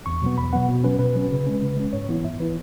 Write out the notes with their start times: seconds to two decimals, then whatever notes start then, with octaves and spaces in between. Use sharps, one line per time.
0.06 E2 C#6
0.22 B2 F#3 B3
0.38 E2 B5
0.53 B2 F#3 B3 F#5
0.69 B2
0.84 F#3 C#4 B4
0.99 B2 B4
1.16 F#3 C#4
1.31 C#3
1.47 G#3 C#4
1.62 C#3
1.77 G#3 C#4
1.93 G#2 C#5
2.09 E3 B3 E4
2.24 G#2 E5
2.39 E3 B3 E4 B4